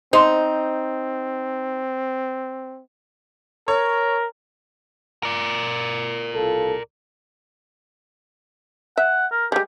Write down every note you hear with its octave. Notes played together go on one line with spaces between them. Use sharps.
C4 D#4 C5
A#4 C#5
A#4 D5
C2 F4 A4
E5 F#5
A#4
G3 G#3 G4